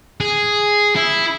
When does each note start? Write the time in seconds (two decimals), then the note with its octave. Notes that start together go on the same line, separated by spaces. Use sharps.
0.21 G#4
0.96 E4